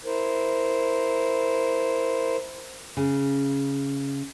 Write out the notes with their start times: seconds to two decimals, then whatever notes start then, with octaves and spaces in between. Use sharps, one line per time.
0.05 E4 A#4 C5
2.97 C#3